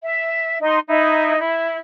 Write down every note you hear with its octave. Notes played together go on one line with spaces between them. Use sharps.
E5
D#4 C6
D#4 E4
E4